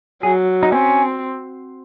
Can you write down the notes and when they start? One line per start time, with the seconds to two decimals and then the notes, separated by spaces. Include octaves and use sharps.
0.23 F#3 G#4
0.63 D#4
0.72 C4 C#4